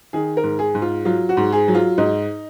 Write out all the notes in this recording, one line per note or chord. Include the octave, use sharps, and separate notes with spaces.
D#3 G#4
A#4
G#2
G#4
G#2
F4
F#3 F4
F#4
G#2
G#4
F#3
F4
G#2 D#4